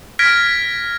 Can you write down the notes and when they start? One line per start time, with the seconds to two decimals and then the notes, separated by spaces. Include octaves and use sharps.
0.19 F6 G#6 A#6 B6 D7